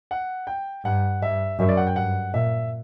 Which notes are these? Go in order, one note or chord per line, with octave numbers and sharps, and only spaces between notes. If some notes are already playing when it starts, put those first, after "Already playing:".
F#5
G5
G2 F#5
G2 E5
F#2 E5
D5
F#5
G5
G2 F#5
A#2 E5